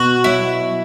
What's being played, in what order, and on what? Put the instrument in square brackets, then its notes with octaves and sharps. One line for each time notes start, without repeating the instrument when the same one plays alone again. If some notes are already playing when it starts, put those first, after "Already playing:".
Already playing: [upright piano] B2 [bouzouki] F#4
[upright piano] F#3 [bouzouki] E4